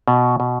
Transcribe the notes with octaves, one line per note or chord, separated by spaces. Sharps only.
B2
B2